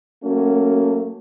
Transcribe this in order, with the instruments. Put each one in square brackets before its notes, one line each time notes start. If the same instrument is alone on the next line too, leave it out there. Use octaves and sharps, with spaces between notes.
[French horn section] F#3 A3 A#3 C#4 F#4